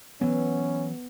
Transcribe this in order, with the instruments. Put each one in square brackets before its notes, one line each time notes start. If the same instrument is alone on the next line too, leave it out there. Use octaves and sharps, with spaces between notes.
[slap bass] E3 F#3 [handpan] B3 [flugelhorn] C#4